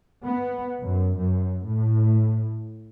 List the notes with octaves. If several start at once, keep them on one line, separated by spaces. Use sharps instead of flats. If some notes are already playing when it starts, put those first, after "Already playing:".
B3
F#2
F#2
A2